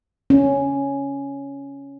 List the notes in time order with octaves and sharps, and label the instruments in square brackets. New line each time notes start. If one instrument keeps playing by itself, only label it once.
[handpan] C#4